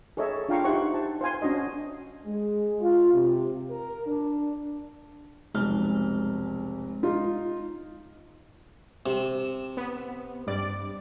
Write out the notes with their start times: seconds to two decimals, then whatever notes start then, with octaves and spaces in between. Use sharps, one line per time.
0.17 G#4 A4 C#5 D#5 E5
0.49 D4 F4 F5 G5 A#5 C#6
0.65 D#4 E4 G4 C5 F#5 C#6
0.94 A5
1.21 C5 F5 G#5 C6
1.42 C#4 D4 F#4 D#5
2.25 G#3
2.80 F4
3.13 C3
3.71 A#4
4.06 D4
5.55 F1 B1 G#3 F6
7.03 D#4 F4
9.06 C3 E7
9.77 B3
10.47 G2 D5